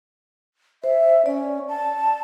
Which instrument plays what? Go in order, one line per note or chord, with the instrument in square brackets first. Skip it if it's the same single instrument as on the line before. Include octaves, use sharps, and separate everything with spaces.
[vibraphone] C5 [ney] E5
[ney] C#4 [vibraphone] D5
[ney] A5